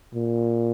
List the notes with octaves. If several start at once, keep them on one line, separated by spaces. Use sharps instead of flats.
A#2